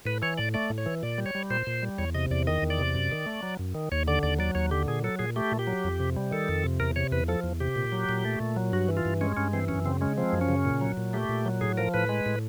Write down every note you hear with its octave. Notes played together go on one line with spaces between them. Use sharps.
A2 B4
E3 C#5
A2 D5
A3 D5
A2
C#5
E3
A#2 D5
G3
C#5
G3
A#2 C5
A#2
G3
E2 C#5
C3 D#5
E2 D5
D#3 D#5
E2
D5
C3
F#2
D#3
A3
F#3
F#2
D#3
D#2 C#5
D3 D5
D#2 D5
F#3 D5
D#2 C#5
D3 G4
A#2 G#4
F#3 A4
A#2 G#4
A3 G4
A#2
G4
F#3
F2
C3
G3
D#3 A4
F2
C3
E2 A#4
C3 C#5
E2 B4
F3 A4
E2
C3 G4
A#2
F#3
A#2
A3
A#2
F#3
G2 F#4
E3
F4
G2
G#3 C#4
G2 C#4
E3 C4
F#2 C#4
C#3 C4
G#3 C#4
F3 C4
F#2
C#4
C#3
A#2
F#3
A#2
A3 G4
A#2
F#3
A2 G#4
F3 A#4
A2 B4
G#3
A2